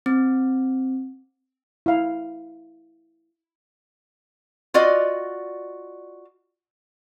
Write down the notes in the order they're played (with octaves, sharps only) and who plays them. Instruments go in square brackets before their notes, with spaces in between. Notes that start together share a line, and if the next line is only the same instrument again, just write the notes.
[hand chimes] C4
[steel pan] E4 F5
[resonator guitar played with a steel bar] F4 F#4 D5 D#5